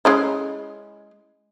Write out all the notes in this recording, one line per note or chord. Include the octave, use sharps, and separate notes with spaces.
G#3 C#4 E4